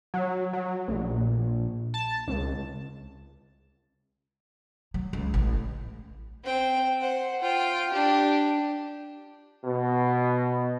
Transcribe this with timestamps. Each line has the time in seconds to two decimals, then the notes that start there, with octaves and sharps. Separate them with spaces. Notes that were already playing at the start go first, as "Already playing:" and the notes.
0.14 F#3
0.53 F#3
0.88 A#1
1.94 A5
2.28 C#2
4.94 F#3
5.13 C#2
5.34 A1
6.44 C4 G5
7.01 C5 F#5
7.42 F4 G5
7.92 D4 G4
9.64 B2